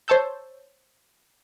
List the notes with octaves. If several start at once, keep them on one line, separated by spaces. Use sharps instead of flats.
C5 C#5 A5 E6 G6